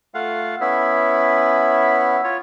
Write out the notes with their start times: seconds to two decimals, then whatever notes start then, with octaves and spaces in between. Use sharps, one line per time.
0.14 A3 F4 F5 F#5
0.61 B3 C#4 E4 E5
2.24 F4 C#5